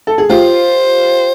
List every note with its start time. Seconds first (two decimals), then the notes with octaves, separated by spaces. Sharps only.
0.07 A4
0.18 G#4
0.29 F4 G4 C5